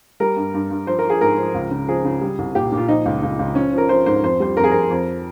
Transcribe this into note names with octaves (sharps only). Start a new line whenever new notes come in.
G3 A#4
G2
G2
G2
F3 C5
A#4
F3
G#4
G#2 A#4
F3
C#2
C#3
F3 G#4
C#3
G3
C2
A#2 G4
A#2
F4
F3 D#4
C#2
C#2
C#2
F3 C#4
F3
A#4
F3 C5
G#2 C5
F2 C5
G3 C5
F2 A#4
G#4
F2 A#4
F2